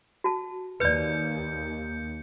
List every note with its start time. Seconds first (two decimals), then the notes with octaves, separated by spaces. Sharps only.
0.24 F#4 A5
0.80 D#2 B4 D5 G6 C#7